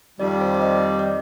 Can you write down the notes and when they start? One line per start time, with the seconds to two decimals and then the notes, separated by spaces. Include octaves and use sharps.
0.19 F2 D#3 G3 D5
0.41 C5
0.55 D5
0.62 D#5
0.76 D5
0.84 D#5
0.99 D5